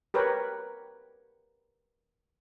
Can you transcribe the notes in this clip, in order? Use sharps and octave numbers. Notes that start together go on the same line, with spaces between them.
G4 A#4 B4 C#5 G5